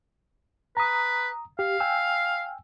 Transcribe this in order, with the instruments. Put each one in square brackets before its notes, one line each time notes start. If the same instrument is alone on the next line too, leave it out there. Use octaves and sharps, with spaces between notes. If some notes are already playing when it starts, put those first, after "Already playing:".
[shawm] B4 [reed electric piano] A#5 D#6
[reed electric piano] G4 [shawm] F5
[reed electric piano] G5 G#5 E6